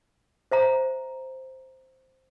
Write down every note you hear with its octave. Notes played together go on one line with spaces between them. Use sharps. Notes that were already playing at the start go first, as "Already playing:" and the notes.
C5 E5 A#5